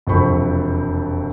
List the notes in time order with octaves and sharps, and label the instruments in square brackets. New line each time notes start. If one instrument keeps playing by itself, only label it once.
[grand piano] E1 F2 C3 C5 B5 C#6